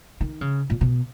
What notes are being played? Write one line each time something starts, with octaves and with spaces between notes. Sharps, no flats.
D#3
C#3
A#2
B2